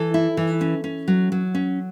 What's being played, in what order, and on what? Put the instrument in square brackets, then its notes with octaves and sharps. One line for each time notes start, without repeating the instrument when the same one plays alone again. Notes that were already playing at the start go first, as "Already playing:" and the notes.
Already playing: [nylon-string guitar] E3 A4
E4
E3
C#4
C#4
F#3
F#3
C#4